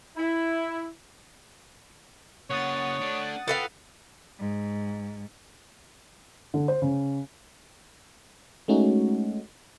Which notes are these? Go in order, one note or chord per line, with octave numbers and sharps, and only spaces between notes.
E4
C#3 A#3 C#5 F#5 D#6 A6
A3 D4
F4 A4 B4 F5 G5
G#2
D3
C5
C#3
G#3 A3 C#4 D#4 F#4